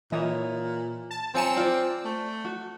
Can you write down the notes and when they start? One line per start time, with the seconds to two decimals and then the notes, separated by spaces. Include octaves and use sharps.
0.12 A#2 E3 C#5 D#5 E5
1.11 A5
1.34 F3 C4 C#5 G#5 A#5 C#7 E7
1.57 F4 C5 D5
2.05 A3
2.45 F#4